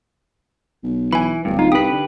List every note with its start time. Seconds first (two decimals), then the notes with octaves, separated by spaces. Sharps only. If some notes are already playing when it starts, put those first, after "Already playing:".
0.83 B1
1.13 E3 G#5 B5
1.45 D1 G2
1.59 D#4 F4
1.72 C2 G4 B4 D#6 B6
1.90 D3